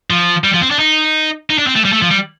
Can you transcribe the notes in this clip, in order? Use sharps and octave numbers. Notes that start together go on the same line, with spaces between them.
F3
G3
F3
C4
D4
D#4
D#4
D4
C4
A3
G3
A3
F3
G3